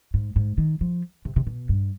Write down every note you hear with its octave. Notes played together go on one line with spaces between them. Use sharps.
G#2
G#2
D#3
F3
C3
C3
B2
G2